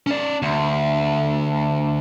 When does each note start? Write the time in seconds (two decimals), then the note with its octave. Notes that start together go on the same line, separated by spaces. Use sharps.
0.07 C#4 D5
0.42 D2